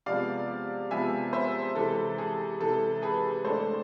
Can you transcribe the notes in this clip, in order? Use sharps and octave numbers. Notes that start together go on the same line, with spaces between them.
C3 F3 G#3 B3 D5 F5
C3 F3 G#3 B3 E5 G#5
C5 E5
C3 E3 G#3 A4
G#4
C3 E3 G#3 A4
G#4 B4
A2 G#3 D4 A4 C5